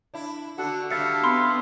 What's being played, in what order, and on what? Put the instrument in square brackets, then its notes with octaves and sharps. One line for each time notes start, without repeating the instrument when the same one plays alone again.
[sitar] D4 E4
[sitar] D3 F#4 [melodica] D4 A4 F#5
[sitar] D3 G3 A3 [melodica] E5 F5 [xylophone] A6 C#7
[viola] B3 [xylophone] B5 C6